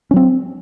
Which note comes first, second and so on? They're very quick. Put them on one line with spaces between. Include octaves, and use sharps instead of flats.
C#4 F#3 C4